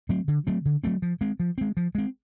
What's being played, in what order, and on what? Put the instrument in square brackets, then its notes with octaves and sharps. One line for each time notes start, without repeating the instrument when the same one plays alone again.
[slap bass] F#3 A3 C4
D3
F#3 A3 C4
D3
F#3 A3 C4
F3
G#3 C4
F3
G#3 C4
F3
G#3 C4